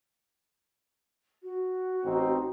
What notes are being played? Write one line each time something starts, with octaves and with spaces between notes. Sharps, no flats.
F#4
A1 C4 D#4